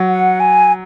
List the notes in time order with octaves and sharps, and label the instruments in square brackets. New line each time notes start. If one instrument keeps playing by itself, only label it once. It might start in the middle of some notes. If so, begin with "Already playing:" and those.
Already playing: [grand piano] F#3
[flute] F#5
G#5